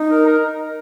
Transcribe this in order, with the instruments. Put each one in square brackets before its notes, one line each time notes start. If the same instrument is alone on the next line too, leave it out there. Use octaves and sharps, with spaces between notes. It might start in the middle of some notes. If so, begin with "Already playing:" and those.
Already playing: [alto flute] D#4
[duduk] A#4
A#4